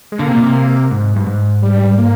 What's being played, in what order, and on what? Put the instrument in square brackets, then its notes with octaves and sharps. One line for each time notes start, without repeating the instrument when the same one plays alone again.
[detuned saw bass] G#3
[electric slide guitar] D3 [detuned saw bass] A#3
[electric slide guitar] C3
A#2
C3
G#2
G2
G#2
[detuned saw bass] G3
A#3